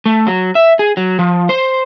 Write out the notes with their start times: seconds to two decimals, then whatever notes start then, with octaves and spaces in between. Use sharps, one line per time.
0.06 A3
0.27 F#3
0.55 E5
0.79 G#4
0.97 F#3
1.19 F3
1.49 C5